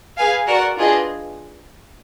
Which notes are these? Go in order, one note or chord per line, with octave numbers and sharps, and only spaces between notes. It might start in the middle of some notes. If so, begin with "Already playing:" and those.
G#4 B4 F5 G#5
F#4 A#4 D5 F#5
D4 F4 G#4 B4 D#5